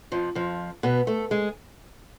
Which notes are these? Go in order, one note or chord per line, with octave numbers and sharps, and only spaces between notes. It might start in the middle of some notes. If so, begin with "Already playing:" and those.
F2 F3
F2 F3
B2 B3
A3 A4
G#3 G#4